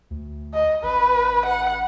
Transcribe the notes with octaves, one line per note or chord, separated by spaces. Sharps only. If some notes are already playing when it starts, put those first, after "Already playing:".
D2
D#5
A1 B4
F#5